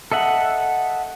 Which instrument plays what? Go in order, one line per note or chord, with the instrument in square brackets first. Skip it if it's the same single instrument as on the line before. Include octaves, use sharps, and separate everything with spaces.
[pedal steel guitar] A4 D#5 E5 F#5